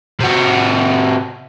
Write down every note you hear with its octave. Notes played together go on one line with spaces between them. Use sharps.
C3 F#4